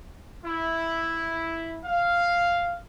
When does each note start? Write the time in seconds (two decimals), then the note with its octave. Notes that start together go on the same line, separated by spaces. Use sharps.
0.45 E4
1.84 F5